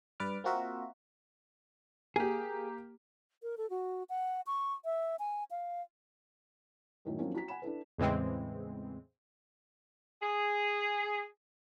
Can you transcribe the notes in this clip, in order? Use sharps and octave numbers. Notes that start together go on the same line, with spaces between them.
G2 B4 D5 D6 F6
A#3 C4 F4 F#4 A#4 E5
A#3 G4 G#4
A#4
A4
F#4
F#5
C#6
E5
G#5
F5
F#2 A2 D#3 F#3
F3 F#3 A#3 C4 C#4 D#4
F#4 A#5 B6
F#5 G#5 B5 E7
D4 E4 A4 B4
E2 A2 C#3 E3 G#3 C4
G#4